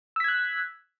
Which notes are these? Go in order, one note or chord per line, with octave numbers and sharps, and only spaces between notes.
E6 F#6 G#6 B6